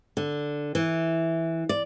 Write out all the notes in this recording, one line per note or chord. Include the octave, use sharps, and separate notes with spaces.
D3
E3
D5